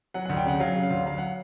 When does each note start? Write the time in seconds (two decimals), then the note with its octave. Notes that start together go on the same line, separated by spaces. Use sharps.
0.14 F#3 F#5
0.26 D2 F#5
0.37 G5
0.46 C#3 F#5
0.60 F#3 F5
0.76 C#3
0.83 F5
0.90 D2
1.06 F#3 F5
1.18 F#5